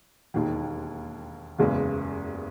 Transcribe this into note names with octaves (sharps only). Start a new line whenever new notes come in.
E1 D#2 D#3
F#1 E2 C#3 G#3